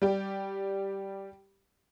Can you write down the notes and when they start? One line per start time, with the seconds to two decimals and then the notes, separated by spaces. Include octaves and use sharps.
0.02 G3 G4